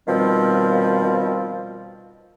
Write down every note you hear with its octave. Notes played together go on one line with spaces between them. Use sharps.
B2 D#3 F3 G3 C4